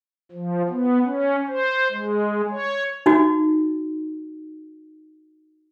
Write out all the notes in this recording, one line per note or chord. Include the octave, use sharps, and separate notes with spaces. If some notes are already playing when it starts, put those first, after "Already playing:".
F3
B3
C#4
C5
G#3
C#5
D#4 F#4